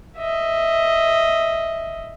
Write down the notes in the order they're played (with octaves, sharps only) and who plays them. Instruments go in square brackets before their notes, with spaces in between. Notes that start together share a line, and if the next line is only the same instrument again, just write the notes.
[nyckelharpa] D#5 E5